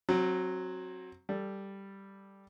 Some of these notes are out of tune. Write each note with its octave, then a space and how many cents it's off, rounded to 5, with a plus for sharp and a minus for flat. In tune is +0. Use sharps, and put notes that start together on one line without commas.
F#3 +0 C4 +25
G3 +0 A4 +0